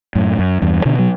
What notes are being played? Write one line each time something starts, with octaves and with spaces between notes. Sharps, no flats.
F#2 A2
F#2
E2 G2
B2 D3
F#3